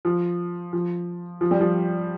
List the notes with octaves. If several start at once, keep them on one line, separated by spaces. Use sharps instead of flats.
F3
F3
F3
G3
F3